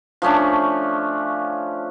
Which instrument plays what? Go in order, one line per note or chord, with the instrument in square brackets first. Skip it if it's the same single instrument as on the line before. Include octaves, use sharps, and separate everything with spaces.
[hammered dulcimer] F3 A3 C#4 D4